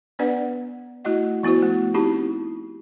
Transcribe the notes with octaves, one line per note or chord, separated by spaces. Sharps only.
B3 D4 B4 D5 F#5
A3 E4 F#4 D#5 F#5
F3 B3 E4 F#4 C5
A3
C4 D#4 E4 G4